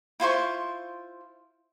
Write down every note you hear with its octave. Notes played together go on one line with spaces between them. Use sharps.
E4 F4 C5 C#6